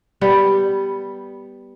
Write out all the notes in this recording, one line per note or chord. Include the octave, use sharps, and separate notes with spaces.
G3 B3 B4